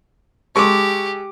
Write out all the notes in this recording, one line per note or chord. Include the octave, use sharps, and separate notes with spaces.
G#3 G4 A4 C#6 D6